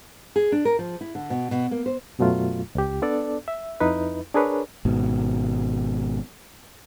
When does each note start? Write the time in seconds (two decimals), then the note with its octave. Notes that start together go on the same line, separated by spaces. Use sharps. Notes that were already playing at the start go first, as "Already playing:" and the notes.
0.36 G#4
0.52 D4
0.65 A#4
0.79 F3
1.01 E4
1.15 D3
1.30 B2
1.51 B2
1.71 A#3
1.86 C5
2.19 F#2 B2 F#3 A3 F4
2.75 C#2 G4
3.02 B3 D4 A4 D5
3.48 E5
3.80 F2 D#4 E4 B4
4.34 D4 G#4 A#4 B4 C#5
4.85 G#1 G#2 B2